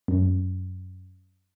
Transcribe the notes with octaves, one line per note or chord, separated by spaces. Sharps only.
F#2